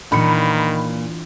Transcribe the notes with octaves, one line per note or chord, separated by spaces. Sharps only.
A#2 D#3 E3 D4 B5 C#7